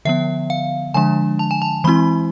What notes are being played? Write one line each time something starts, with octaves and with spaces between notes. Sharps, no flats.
D3 F3 B3 E5
F5
D3 F3 G#3 D4 G#5
A5
G#5
A5
E3 G#3 C4 E4 B5